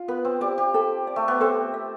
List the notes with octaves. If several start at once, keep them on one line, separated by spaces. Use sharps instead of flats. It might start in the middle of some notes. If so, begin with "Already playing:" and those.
Already playing: F4
B3 B4
C4
G4 D5
G4
A4
D5
A3
B3
C4 A4
E5